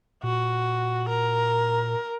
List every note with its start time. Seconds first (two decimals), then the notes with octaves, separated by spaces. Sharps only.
0.23 A#2 F#4
1.08 A#4